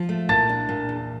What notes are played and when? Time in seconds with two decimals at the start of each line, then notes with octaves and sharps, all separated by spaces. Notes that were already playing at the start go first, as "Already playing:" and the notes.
Already playing: F3
0.09 A3
0.29 A#2 A5 A6
0.49 D4
0.69 A#2
0.89 E2